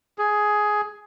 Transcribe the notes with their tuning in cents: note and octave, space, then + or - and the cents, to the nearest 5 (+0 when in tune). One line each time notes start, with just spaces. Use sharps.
G#4 +10